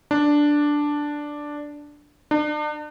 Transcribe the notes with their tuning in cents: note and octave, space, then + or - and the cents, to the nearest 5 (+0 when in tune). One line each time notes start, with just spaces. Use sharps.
D4 +0
D4 +40